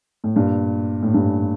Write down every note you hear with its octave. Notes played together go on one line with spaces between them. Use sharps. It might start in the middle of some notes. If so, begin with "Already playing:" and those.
A2
G2 A#2
A2
G2